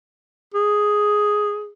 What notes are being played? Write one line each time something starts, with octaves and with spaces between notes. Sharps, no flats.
G#4